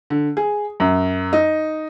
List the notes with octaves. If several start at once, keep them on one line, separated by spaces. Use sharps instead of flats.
D3
G#4
F#2
D#4